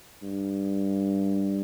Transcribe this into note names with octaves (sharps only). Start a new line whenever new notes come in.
G2